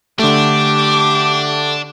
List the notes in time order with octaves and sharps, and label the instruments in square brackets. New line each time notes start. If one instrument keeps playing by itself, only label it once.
[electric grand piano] D3 A3 [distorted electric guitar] D4 [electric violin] G4 D6